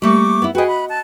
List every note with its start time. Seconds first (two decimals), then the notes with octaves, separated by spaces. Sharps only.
0.02 G3 A3 A#3 C#6 D6
0.42 B3 E4
0.55 F#4 G#4 B4 D#5 G5
0.68 B5 F#6
0.89 A5 F#6